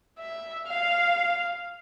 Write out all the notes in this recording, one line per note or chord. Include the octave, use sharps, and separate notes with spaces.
E5
F5